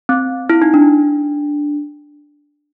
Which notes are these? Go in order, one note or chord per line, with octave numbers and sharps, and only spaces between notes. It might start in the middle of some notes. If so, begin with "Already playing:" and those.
C4
E4
D#4
D4